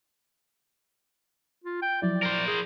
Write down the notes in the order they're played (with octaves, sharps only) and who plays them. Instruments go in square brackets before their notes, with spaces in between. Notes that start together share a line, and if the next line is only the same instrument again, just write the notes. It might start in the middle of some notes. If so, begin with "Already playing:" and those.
[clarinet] F4
G5
[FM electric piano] F3 F#3 E4 [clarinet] D5
[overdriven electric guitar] A#4 C5
[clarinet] G#4